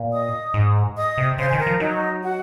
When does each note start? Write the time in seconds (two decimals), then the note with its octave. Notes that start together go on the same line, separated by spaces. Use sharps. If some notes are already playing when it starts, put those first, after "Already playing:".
Already playing: A#2
0.12 D#5 D#6
0.54 G#2
0.96 D#5 D#6
1.18 C3
1.38 C#3 C5 C6
1.50 D#3 G#5
1.59 A#4 A#5
1.67 F3
1.80 F#3 D#4 D#5
2.23 F#4 F#5